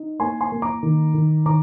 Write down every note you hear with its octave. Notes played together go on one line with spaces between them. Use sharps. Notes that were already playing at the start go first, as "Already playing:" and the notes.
Already playing: D#4
A#3 G#5 C6
G#5 C6
A#3
A#5 D6
D#3
D#3
D#3 A#5 D6